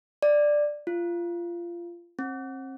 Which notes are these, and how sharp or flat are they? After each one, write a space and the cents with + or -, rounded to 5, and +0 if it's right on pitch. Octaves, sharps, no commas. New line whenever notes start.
D5 +5
F4 -20
C4 +35